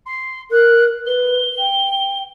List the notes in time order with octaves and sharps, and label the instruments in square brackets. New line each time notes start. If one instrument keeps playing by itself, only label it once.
[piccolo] C6
[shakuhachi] A#4 [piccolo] F#6
[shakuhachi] B4 [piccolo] G7
[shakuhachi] G5